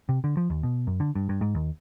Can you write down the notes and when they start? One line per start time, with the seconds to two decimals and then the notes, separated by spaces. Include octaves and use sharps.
0.09 C3
0.24 D3
0.37 F3
0.50 D#2
0.63 B2
0.87 F#2
1.00 D3
1.15 G2
1.29 G2
1.41 G#2
1.55 D#2